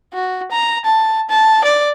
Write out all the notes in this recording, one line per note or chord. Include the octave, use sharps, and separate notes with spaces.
F#4
A#5
A5
A5
D5